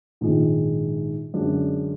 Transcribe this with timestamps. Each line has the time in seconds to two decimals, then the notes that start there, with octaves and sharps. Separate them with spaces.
0.21 A#1 G#2 D#3 G#3
1.34 F#2 D3 G#3 D4